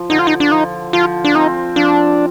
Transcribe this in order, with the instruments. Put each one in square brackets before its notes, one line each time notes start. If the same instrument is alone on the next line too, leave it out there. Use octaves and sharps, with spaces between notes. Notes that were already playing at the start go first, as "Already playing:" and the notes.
Already playing: [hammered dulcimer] F3
[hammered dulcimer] D3 [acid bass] D#4
[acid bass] F4
D#4
D4
[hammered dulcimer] F3 [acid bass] D#4
[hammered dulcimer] F3 [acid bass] F4
[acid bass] D4
[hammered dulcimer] C4 [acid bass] D#4
[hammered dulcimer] F3 [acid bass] D4